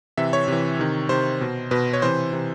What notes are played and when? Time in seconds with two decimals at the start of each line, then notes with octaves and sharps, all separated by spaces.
0.17 C3 E3 E5
0.33 C#5
0.48 C3 E3
0.79 C3 D#3
1.09 C3 D#3 C5
1.41 B2
1.71 B2 B4
1.93 C#5
2.02 C3 E3 C5
2.33 C3 E3